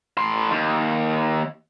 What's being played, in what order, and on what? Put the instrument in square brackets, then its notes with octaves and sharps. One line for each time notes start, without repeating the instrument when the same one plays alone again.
[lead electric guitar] A2 C6
D#2